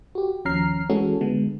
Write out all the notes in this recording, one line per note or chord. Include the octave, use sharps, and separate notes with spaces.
F#4 G4
D#2 F3 C#4 A#5 F6 C7
E3 G#3 C#4 F#4 G#4 A4
D3 G#3 B3